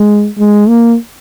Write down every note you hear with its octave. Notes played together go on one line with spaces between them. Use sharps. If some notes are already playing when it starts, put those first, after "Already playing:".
Already playing: G#3
G#3
A#3